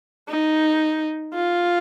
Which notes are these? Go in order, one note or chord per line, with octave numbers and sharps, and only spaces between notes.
D#4
F4